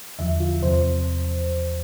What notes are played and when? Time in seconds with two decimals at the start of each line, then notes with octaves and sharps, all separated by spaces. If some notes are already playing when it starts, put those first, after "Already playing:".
0.19 E2 D3 F3 E5
0.40 F4
0.62 E2 C3 F3 C5